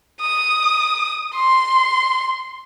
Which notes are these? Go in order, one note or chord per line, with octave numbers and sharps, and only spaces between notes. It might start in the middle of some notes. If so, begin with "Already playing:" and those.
D#6
C6